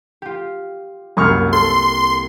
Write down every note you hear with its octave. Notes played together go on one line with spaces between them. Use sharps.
F4 G4
C2 F#2 A#3 C#6 F6
A4 C6